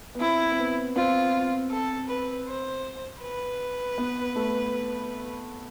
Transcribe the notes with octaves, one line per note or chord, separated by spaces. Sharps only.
B3
C4 E4
C4
B3
C4 F4
A4
B4
C5
B4
B3
A3